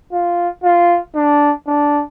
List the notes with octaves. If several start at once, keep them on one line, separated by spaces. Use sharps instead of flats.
F4
F4
D4
D4